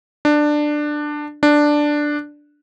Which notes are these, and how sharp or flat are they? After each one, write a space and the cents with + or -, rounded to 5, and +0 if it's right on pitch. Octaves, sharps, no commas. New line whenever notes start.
D4 +15
D4 +5